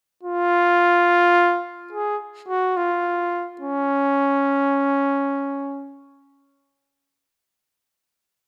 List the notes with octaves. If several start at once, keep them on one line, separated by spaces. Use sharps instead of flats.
F4
G#4
F#4
F4
C#4